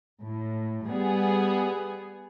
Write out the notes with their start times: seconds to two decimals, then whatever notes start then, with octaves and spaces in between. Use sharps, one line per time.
0.22 A2
0.87 G3 B3 G#4